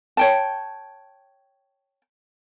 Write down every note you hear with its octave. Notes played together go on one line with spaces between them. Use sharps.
C#5 G5 A5